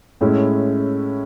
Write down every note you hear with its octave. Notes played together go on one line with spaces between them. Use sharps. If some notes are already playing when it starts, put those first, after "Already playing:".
A2 G#3 C#4 E4